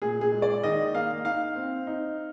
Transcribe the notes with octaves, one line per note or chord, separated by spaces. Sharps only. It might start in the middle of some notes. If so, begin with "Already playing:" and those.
A#2 G#4
G#4
G#3
D5
D#3 D#5
A#3 F5
D#4 F5
C4
D#4